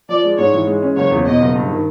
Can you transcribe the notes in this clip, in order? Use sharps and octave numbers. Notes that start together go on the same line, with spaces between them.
F3 D5
G#3
G#2 C#5
E3
G#3
C#4
F#1 C#5
E2
B2 D#5
F#1
G2
D#3